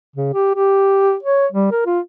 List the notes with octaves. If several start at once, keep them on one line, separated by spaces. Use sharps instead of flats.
C#3
G4
G4
C#5
G3
A#4
F4